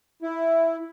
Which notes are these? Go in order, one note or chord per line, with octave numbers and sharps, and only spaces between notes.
E4